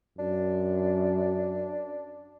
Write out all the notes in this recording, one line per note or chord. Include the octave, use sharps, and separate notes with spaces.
F#2 D4